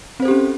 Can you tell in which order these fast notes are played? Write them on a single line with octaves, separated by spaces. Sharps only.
C4 C5 A4 G4 C#4